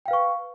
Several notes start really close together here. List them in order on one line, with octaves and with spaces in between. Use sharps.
G5 F5 B4 C#6